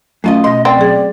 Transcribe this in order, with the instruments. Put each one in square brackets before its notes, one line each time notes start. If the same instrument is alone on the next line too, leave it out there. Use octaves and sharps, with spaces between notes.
[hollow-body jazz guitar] F#2 F4 D#5 [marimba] A3 C#4
[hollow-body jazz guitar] B2 C6 [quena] D#5
[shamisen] C4 [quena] D5
[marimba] F#3 G#4 [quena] D5